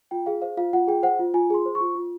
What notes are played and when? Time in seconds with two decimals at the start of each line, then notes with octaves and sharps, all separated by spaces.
0.11 F4 G5
0.26 G#4 F5
0.42 C5 F5
0.57 F4 F5
0.73 F4 F#5
0.88 G#4 G5
1.03 C5 F#5
1.19 F4
1.34 F4 G#5
1.50 G#4 C6
1.66 C5
1.75 C#6
1.81 F4
1.95 F4